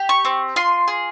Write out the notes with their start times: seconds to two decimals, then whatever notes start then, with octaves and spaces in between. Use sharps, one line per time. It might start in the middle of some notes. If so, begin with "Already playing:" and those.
Already playing: G4
0.09 C#6
0.25 C4
0.56 F4 C6
0.88 G#4